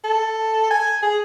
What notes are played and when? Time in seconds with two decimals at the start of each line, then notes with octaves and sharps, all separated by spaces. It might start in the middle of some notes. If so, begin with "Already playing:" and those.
0.04 A4
0.71 G#5
1.02 G#4